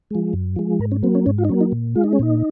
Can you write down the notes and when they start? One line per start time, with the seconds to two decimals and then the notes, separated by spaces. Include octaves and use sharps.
0.11 F3 G#3
0.33 F#2
0.56 F3 G#3
0.79 G#2 A#4
0.92 C#4
1.03 F#3 A#3 C4
1.15 C#4
1.26 G#2 C#4
1.38 F4
1.45 D#4
1.49 F#3 A#3 C#4
1.61 D#4
1.72 A#2
1.95 G#3 F4
2.04 D#4
2.13 C#4
2.19 A#2 D#4